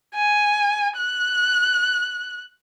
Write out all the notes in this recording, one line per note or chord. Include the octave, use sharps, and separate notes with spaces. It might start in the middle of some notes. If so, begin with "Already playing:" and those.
G#5
F#6